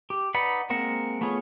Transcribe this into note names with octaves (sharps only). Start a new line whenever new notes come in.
G4
D#4 B4 D5 F#5 B5
G#3 A#3 C4 A#4 F#5
A3 B3 F4 G#4 C#5